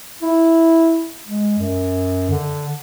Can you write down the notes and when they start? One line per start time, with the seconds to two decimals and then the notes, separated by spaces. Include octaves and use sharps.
0.22 E4
1.28 G#3
1.58 F#2
2.30 D3